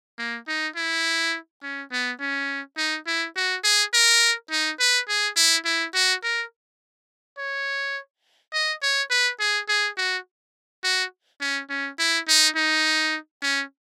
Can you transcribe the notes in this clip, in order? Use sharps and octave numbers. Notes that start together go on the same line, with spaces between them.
A#3
D#4
E4
C#4
B3
C#4
D#4
E4
F#4
G#4
A#4
D#4
B4
G#4
E4
E4
F#4
A#4
C#5
D#5
C#5
B4
G#4
G#4
F#4
F#4
C#4
C#4
E4
D#4
D#4
C#4